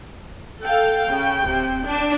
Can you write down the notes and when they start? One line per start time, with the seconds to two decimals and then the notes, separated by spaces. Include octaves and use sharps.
0.64 A4 F5 G5
1.09 C#3
1.45 D1 C3
1.85 D4